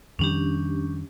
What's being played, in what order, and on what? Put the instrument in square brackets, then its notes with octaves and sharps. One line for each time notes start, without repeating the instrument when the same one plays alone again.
[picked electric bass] F2 D#3 G3 [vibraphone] C#4 D4 G4